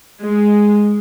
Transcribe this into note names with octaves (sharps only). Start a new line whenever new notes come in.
G#3